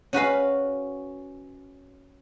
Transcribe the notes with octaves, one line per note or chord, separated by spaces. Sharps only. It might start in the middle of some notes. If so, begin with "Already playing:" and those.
C#4 F#4 B4 F5